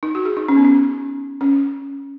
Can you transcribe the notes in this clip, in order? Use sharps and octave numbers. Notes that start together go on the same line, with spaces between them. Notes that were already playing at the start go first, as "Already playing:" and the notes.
D#4
F#4
G#4
D#4
C#4
B3
C#4
C#4